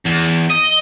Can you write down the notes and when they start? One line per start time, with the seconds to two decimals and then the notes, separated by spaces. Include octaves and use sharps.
0.05 E2
0.51 D#5